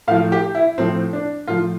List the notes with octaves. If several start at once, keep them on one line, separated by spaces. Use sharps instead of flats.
A2 F3 F5
G4
E4
A2 F3 C4
D4
A2 F3 F4